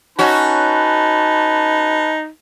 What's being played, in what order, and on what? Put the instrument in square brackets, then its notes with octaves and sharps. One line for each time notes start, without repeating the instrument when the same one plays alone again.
[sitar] C#4 F#4 [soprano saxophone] D#4 [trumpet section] B4 A5